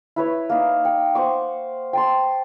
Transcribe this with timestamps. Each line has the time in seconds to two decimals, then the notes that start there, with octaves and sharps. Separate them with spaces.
0.16 E4 B4 C#5
0.49 A#3 D#4
0.85 G5
1.15 C5 F#5 C#6 D6
1.93 G5 A5 C6